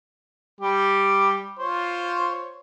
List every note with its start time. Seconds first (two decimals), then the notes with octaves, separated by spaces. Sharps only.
0.61 G3 G4
1.59 F4 C5 C#5